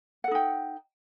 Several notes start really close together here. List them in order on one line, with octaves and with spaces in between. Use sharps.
F#5 A4 D#4 G5